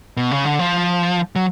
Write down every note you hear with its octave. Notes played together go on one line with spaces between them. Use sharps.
B2
C#3
D3
F3
F#3